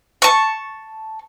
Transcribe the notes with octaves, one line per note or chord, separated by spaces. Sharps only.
A5 C#6